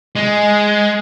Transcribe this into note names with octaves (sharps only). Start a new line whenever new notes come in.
G#3